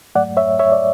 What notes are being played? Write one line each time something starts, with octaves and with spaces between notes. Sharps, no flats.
G#2 F#3 A3 D5 F#5
C#5 E5
C#5 E5
D5